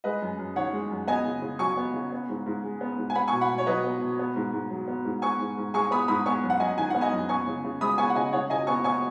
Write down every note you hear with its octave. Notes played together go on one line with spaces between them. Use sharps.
G#3 B4 D#5
F#2
F#2
D#3 C#5 F#5
G#3
F#2
B3 D#5 G#5
C#3
C#3
F#3 G#5 C#6
B3
C#3
B3
G#2
G#2
G#3
B3
G#2
G#5
B3 F#5 B5
G#5 C#6
B2
F#5 B5
B2
C#5
F#3 B4 D#5
B3
B2
B3
G#2
G#2
F#3
B3
G#2
B3 G#5 C#6
G#2
G#2
G#3 G#5 C#6
B3 B5 D#6
G#2 B5 D#6
B3 G#5 C#6
F#2
F#5
F#2 D#5 G#5
D#3 G#5
B3 F#5
D#5 G#5
F#2
B3 G#5 C#6
C#3
C#3
G#3 B5 D#6
B3 G#5 C#6
F#5
C#3 D#5 G#5
C#3 C#5 F#5
C#3 D#5 G#5
B3 G#5 C#6
B3 G#5 C#6